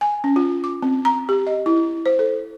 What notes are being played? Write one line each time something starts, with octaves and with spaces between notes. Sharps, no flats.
G#5
C#4
F4
D6
C4
A#5
G4
D#5
E4
C5
A4